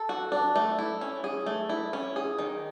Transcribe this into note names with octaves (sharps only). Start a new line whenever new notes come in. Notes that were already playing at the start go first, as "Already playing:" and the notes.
Already playing: A4
F#4
D4
A3
E4
C#4
G#4
A3
E4
C#4
G#4
D#3